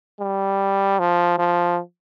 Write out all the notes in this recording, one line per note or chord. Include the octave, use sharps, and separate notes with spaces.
G3
F3
F3